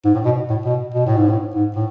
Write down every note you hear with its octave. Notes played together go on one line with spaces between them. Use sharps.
G#2
A2
B2
A2
B2
B2
A2
G#2
A2
G#2
A2